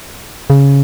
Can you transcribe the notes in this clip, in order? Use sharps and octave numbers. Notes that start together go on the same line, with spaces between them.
C#3